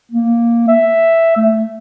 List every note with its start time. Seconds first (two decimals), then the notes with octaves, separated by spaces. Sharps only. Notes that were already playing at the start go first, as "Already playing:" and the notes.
0.12 A#3
0.68 E5
1.37 A3